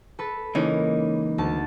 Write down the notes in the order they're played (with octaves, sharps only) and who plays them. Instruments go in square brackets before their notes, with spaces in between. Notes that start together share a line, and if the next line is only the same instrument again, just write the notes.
[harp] A4 B4
[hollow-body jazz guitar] C#2 E3 C#4 [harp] A#3 D#4
[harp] D2 A5